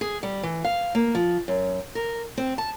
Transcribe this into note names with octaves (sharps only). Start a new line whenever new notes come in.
G#4
G3
E3
F5
A#3
F3
F#2
A#4
C4
A5